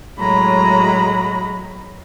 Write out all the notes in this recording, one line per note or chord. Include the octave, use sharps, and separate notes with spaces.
A2 F#3 G#3 A#5 B5